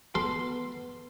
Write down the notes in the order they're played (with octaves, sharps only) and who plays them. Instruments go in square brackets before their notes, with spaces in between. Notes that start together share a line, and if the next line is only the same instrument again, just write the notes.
[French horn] B3 [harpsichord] A4 [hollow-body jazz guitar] C6